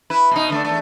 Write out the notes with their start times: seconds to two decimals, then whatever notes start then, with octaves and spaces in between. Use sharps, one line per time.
0.10 E4 B4
0.31 B2 D#4
0.50 D3 A3 D4
0.65 E2 A3